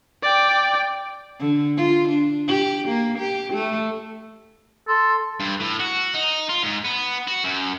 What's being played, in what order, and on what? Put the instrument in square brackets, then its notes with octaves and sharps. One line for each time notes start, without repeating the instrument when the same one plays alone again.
[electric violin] D5 G5
[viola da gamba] D3
F4
D4
G4
A#3
G4
A3
[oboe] A4 [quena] C6
[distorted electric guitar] G2
A2
F#4
D#4
F4
G#2
B3
F#4
F#2